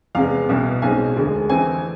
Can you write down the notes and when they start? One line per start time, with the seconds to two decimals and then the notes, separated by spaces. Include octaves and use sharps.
0.15 E2 C3 G#3 B3 F5
0.49 C2 B2 B3
0.82 B1 B2 G#3 C4 G#5
1.16 E1 D2 D3 G#3
1.49 F2 E3 A3 C4 G#5